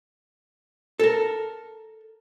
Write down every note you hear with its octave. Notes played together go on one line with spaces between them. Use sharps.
A4 A#4